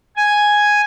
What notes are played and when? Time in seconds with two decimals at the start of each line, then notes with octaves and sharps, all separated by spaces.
0.17 G#5